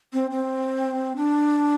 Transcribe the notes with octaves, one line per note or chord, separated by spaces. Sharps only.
C4
C4
D4